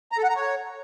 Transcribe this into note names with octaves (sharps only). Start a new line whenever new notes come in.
A#5
A4
F#5
A#5
C#5